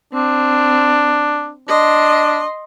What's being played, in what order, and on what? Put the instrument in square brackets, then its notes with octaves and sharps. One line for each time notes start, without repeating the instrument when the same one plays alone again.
[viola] C4 [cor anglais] D4
[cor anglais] D4 [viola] D#5 C6